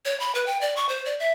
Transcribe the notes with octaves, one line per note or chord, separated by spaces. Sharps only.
C#5
B5
B4
G5
D5
C#6
C5
D5
E5